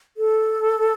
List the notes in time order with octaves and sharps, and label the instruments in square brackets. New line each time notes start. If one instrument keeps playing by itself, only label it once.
[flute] A4